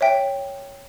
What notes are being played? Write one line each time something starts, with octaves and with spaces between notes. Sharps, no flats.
C#5 E5 G5